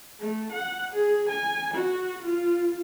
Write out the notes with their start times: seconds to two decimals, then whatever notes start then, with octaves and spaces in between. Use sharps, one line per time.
0.20 A3
0.52 F#5
0.93 G#4
1.29 G#5
1.74 F#4
2.23 F4